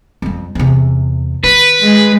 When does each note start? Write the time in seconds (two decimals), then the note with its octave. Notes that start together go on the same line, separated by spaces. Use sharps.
0.22 F2 G3
0.55 E2 C3
1.44 D#3 B4
1.81 G#3